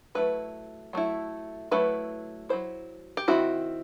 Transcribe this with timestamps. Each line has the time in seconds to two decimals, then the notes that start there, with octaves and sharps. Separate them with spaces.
0.15 F#3 A3 E4 B4
0.93 F#3 A3 E4
1.71 F#3 A3 E4 B4
2.49 F#3 A3 E4 C5
3.17 G4
3.28 D#3 A3 C4 E4 F#4